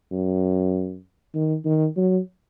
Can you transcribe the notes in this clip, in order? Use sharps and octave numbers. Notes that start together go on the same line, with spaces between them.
F#2
D#3
D#3
F#3